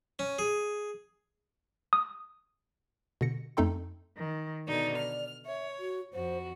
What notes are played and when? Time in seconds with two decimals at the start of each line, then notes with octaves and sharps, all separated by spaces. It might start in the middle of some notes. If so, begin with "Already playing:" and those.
0.19 C#4
0.39 G#4
1.93 D#6
3.21 B2 D3 A#6 C#7
3.57 F2 A3 D#4 A4 G5 C6
4.18 D#3
4.68 B2 D3 D#4 D5
4.97 F6
5.46 C#5 E5
5.80 F#4
6.13 F2 F#4 C5